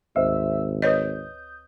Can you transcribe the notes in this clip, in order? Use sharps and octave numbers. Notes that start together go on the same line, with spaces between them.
G#1 D2 C5 E5 E6
B4 C#5 D#5 D#6 G6